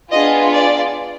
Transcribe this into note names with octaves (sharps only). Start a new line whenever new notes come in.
B3 D4 F4 G#4 D#5
D5